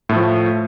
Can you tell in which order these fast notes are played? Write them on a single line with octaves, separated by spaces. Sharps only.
A2 A3 F3